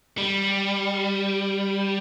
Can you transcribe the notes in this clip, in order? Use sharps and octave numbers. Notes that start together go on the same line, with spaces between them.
G3